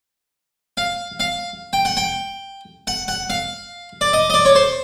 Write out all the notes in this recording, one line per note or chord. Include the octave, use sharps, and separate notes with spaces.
F5
F5
G5
F#5
G5
F#5
F#5
F5
D5
D#5
D#5
D5
C#5
C5